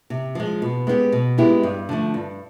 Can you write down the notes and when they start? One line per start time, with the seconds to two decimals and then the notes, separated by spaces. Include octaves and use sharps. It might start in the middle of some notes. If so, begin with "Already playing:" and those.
0.10 C3
0.35 F3 G#3
0.62 B2
0.87 G#3 B3 E4 G4
1.12 B2
1.38 G#3 B3 E4 G4
1.63 G2
1.89 D3 F3 A3
2.14 G2